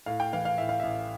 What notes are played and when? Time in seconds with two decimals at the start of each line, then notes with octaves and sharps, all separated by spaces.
0.06 A2 F5
0.20 G5
0.33 E3 F5
0.45 F5
0.58 A2 E5
0.69 F5
0.80 A1 E5